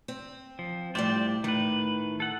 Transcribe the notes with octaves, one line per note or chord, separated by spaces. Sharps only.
C4
F3
A2 F3 G3 C5 D5
A2 D#3 B4
A4 F#5